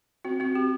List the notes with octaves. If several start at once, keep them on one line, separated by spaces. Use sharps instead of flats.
C4 F#4
C4 F#4
C4 G4